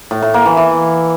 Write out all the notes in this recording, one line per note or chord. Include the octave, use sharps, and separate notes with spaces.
A2
A2
A#3
E3
E3